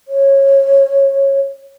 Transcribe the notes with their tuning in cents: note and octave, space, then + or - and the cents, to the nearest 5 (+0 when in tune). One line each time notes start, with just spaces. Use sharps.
C#5 -20